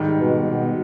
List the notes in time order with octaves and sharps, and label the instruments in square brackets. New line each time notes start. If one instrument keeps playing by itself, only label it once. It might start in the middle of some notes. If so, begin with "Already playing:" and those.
Already playing: [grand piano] G#2 D#3 G3
[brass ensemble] B2
B2